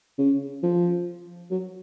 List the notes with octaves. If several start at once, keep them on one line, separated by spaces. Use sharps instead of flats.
C#3
F3
F#3